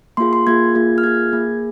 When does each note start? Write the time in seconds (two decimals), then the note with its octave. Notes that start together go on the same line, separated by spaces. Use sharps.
0.17 A#3 F4 G#4 C6
0.33 C6
0.47 A#3 F4 G#4 G#6
0.75 A#3 F4 G#4
0.98 F6
1.03 A#3 F4 G#4 G#6
1.33 A#3 G#4